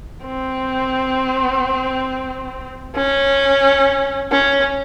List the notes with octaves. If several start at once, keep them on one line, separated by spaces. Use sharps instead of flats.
C4
C#4
C#4